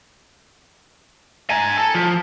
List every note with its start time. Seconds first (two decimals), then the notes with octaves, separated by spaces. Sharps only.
1.50 G#5 A#5
1.77 A4
1.94 F3